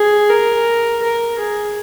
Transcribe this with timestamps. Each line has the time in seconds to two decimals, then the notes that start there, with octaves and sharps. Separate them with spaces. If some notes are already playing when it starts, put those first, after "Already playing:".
Already playing: G#4
0.30 A#4
1.03 A#4
1.39 G#4